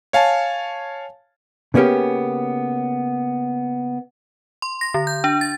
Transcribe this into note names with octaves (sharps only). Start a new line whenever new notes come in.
C#5 F5 G#5 A5
C#3 A#3 B3 C#4 G4
C6
A#6
D3
G6
D4
A6